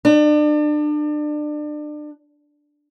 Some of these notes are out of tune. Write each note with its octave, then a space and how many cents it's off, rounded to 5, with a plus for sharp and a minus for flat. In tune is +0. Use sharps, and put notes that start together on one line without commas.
D4 +30